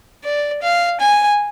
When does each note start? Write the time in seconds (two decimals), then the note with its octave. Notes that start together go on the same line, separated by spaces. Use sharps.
0.25 D5
0.63 F5
1.01 G#5